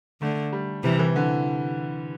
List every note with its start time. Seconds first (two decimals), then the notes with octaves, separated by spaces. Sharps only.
0.21 D3 A3
0.52 G3
0.84 C3 E3 G3
0.99 E3
1.16 D3